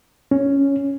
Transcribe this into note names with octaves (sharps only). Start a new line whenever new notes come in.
C#4